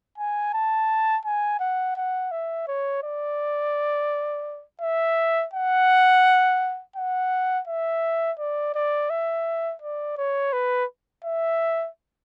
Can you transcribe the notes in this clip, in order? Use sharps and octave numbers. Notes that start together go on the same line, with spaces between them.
G#5
A5
G#5
F#5
F#5
E5
C#5
D5
E5
F#5
F#5
E5
D5
D5
E5
D5
C#5
B4
E5